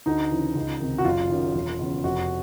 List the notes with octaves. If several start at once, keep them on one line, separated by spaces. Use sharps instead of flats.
D2 D#4
C#3 E3
C#2
C3 D#3
F#4
F#1 F4
F#2 D#3
E1
E2 C#3
F1 F#4